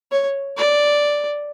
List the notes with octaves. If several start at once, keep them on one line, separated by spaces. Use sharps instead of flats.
C#5
D5